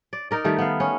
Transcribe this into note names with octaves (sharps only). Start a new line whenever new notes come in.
D5
D#4 A#4 D5
D#3 G3 A3
B3 F5
C#4